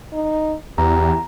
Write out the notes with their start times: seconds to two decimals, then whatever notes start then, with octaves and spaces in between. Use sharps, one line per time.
0.13 D#4
0.78 E2 G4 A#5